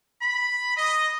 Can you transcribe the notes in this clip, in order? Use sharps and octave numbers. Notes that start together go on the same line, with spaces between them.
B5
D#5